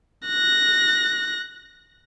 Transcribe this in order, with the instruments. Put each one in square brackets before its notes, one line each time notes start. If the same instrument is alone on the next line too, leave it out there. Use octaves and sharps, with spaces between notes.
[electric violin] F#6 A#6